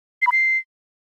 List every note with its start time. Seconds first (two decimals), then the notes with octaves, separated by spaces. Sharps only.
0.22 C7
0.27 B5
0.32 C7